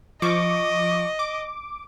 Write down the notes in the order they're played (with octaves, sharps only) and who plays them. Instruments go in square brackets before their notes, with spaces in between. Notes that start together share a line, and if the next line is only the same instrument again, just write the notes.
[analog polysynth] F3 C#6 D6 [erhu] D#5
[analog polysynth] D6